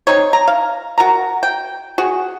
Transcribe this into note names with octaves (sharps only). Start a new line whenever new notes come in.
C4 D#4 C#5
A#5
F5
F#4 A#4 A#5
G5
F#4 G#4